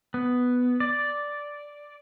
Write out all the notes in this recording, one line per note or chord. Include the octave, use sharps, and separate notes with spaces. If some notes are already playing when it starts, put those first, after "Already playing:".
B3
D5